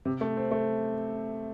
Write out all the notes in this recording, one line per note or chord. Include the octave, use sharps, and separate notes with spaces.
C3
A3
C4
A3